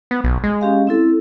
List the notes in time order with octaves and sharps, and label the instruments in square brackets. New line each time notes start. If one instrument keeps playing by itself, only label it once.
[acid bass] B3
B1
G#3
[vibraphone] C#4 G4 F5
C4 E4 A4